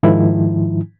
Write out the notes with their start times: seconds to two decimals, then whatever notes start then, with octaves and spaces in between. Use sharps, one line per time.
0.03 G#2 D#3 F3 E4